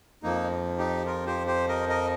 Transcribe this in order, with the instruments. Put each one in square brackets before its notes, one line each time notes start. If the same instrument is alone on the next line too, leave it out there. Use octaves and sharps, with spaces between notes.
[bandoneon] F2 F3 A#3 D#4
D#4 G4
F4 A#4
G4 C5
G4 C5
A#4 D#5
A#4 D#5